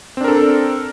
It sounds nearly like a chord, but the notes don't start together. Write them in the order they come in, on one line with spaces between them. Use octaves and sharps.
C4 D4 A#4 A4